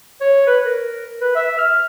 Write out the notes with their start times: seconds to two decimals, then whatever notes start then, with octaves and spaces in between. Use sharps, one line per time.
0.21 C#5
0.47 B4
0.65 A#4
1.21 B4
1.36 E5
1.58 F6